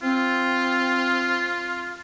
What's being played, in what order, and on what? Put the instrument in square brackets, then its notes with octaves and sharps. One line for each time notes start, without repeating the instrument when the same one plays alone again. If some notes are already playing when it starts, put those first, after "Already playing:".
[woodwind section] C4 [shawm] F4